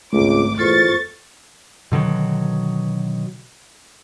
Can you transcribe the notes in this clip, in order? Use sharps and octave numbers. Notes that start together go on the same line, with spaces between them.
G#1 C#2 A3 D6
E2 F4 A4 C5 C#6 A6
B2 D3 D#3 F#3